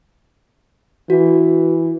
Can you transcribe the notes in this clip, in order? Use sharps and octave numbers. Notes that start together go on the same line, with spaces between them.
E3 F#4